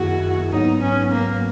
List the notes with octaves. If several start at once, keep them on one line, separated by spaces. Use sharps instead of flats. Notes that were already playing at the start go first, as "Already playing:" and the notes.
Already playing: F#2 D#3 A#3 E4 F#4 G#4
G#2 F#3 B3 D#4
C#4
A#3